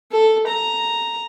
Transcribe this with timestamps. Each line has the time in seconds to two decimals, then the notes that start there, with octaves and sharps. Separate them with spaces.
0.12 A4
0.47 A#5